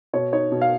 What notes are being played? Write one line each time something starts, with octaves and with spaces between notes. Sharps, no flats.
B2 C#5
D#4 C#5
B2
F5